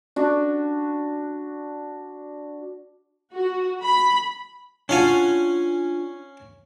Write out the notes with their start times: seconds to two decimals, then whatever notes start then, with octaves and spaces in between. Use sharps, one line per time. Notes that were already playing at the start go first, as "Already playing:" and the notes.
0.16 D4 F#4
3.34 F#4
3.84 B5
4.89 C#4 D4 F4 F#4 F5 G#5